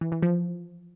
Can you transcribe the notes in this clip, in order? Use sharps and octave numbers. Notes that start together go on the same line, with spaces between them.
E3
E3
F3